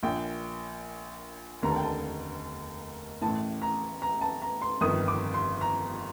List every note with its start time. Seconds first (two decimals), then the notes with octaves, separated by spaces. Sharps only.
0.03 A#1 A#2 G5
1.62 F1 D#2 D3 A#5
1.70 A5
1.76 G5
1.83 A5
3.21 A1 A2 A5
3.62 A#5
4.02 A#5
4.21 A5
4.42 A#5
4.62 C6
4.81 G1 F2 D#3 D#6
5.08 D6
5.34 C6
5.61 A#5